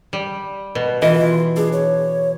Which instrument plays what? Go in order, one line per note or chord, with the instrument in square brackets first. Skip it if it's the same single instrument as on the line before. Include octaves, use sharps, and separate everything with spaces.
[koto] G3
B2
[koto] E3 [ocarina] F4 [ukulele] D#5
[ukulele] D4 [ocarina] G#4
[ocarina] C#5